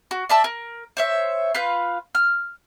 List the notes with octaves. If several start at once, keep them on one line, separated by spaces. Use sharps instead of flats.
F#4
D5 E5 A5 E6
A#4
C5 C#5 E5
F4 B4 F5 G6
F6